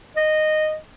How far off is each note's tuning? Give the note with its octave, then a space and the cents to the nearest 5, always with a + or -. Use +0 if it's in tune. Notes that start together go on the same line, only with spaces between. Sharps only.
D#5 -10